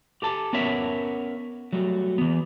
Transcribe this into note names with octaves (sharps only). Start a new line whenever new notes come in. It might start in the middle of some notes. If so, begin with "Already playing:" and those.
G4 A4 A5
B3 C#4 A#4 C#5 E5
F#3 G3 A3
E3 B3